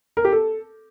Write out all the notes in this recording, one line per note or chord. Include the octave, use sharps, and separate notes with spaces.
A#4
G4
A4